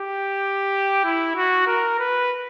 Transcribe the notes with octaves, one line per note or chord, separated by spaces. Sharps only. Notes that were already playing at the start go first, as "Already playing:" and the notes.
Already playing: G4
E4
F#4
A#4
B4